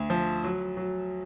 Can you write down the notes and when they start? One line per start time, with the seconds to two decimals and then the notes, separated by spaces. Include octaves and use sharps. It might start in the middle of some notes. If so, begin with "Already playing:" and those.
Already playing: D2
0.10 F3
0.44 F#3
0.77 F#3